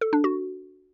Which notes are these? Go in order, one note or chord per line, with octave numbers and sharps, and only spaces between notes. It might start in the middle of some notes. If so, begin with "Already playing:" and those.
A4
D4
F#4